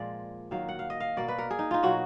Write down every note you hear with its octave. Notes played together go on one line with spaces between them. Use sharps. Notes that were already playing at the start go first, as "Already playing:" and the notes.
Already playing: A#2 F3 G#3 D5
D#3 F#3 A#3 F5
F#5
F5
D#5
F5
B2 A#3 D5
B4
A#4
G#4
D#4
D#4 F4
B2 F#3 A#3 F#4